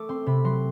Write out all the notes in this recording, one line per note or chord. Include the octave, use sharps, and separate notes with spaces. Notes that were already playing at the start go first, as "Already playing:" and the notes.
Already playing: A3 D6 E6
C4 C6
C3 B5
F#3 C6